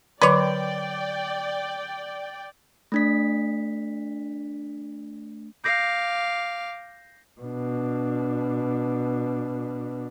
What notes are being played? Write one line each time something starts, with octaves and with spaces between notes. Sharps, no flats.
D3 F#3 B4 C#5 D5 G5 D6
A3 D4 B6
F5 D6 G6 A#6 C7
B2 D4